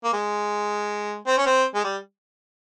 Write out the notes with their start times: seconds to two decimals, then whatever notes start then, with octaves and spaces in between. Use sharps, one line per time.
0.05 A#3
0.13 G#3
1.27 C4
1.38 C#4
1.46 C4
1.75 G#3
1.84 G3